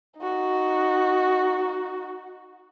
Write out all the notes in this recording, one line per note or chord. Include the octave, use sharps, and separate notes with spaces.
D#4 F#4